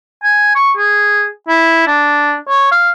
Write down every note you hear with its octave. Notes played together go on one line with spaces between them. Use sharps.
G#5
C#6
G#4
E4
D4
C#5
F5